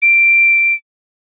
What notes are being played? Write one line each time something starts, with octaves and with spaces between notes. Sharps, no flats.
D7